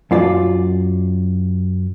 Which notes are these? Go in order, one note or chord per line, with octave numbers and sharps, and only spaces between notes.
F#2 F4 D5